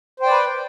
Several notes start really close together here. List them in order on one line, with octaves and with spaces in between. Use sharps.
C5 G5 D5 B4